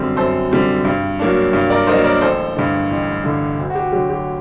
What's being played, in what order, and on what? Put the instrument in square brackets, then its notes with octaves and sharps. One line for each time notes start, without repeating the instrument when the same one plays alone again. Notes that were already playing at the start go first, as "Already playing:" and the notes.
Already playing: [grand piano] F#2 D3 G3 C4
F#2 A4 C5
D3 G3 C4
G2
F#3 A#3 D4
G2
A#4 D5
F#3 A#3 D4 C5 D#5
A#4 D5
A1 A4 C5
G2 D3
A1
G2 D3
D2
F#4
G4
D3 F#3 G4
G4